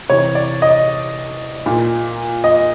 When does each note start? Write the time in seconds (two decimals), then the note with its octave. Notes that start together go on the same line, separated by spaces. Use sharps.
0.10 C3 E3 C#5
0.35 D5
0.62 D#5
1.66 A#2
2.44 D#5